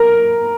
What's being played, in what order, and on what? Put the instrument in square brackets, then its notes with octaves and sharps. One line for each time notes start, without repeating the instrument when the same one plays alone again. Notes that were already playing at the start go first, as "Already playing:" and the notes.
Already playing: [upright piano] A#4